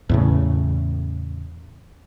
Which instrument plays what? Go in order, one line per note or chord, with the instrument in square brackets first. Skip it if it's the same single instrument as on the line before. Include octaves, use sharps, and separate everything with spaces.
[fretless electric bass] E2 A2 C#3